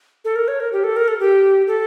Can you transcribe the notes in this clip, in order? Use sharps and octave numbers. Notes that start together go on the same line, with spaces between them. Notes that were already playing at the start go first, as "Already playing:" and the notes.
A4
A#4
C#5
A#4
G4
A4
A#4
A4
G4
A4